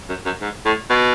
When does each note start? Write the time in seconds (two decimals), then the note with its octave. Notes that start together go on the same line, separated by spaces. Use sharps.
0.09 F#2
0.25 F#2
0.42 G#2
0.65 A2
0.90 B2